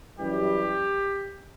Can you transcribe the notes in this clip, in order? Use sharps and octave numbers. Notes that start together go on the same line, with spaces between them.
F#2 E3 G3 G4